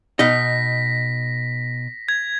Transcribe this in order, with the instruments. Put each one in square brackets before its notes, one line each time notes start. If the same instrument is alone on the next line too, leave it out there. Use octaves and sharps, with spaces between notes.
[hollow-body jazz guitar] B2 D#4 D#5 [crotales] A#6 B6
[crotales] G#6